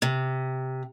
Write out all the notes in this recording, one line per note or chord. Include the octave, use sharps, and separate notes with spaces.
C3